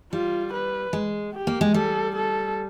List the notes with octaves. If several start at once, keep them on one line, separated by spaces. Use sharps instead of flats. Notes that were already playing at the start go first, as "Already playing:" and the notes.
G3 F4
B4
G#3
G4
A#3
G#3
G3 A4
A4